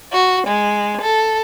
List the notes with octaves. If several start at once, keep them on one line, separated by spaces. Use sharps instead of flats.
F#4
G#3
A4